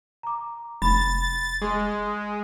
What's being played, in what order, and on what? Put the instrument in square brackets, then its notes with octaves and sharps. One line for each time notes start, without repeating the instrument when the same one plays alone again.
[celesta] A#5 D6
[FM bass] F1 [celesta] B5 [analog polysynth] A6
[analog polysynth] G#3 [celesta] G#4